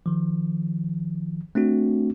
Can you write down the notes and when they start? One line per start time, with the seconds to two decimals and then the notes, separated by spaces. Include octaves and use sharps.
0.06 D#3 F3
1.55 A3 C4 D4 F#4